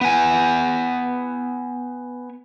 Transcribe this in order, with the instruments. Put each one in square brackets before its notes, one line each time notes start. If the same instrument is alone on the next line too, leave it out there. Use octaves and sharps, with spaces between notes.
[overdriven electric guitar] B3 G#5